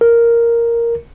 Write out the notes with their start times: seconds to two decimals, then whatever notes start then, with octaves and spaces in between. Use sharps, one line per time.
0.01 A#4